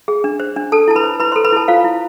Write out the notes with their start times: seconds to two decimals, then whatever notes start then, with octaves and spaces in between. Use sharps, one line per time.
0.08 G#4
0.24 D4
0.40 C5
0.56 D4
0.72 A4 A5
0.88 E4 A5
0.96 B4 B5
1.04 C5
1.20 E4 B4 B5
1.32 A4 C5 C6
1.45 B4 B5
1.53 E4 A4 A5
1.68 F4 C5 F5
1.84 E4